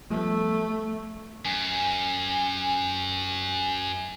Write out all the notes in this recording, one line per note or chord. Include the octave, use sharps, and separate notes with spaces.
F3 G3 A3 B3
F#2 G#5